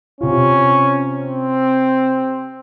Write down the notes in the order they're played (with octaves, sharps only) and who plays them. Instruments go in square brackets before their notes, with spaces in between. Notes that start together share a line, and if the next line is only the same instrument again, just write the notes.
[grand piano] C3 F4 [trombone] C#4
[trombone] C4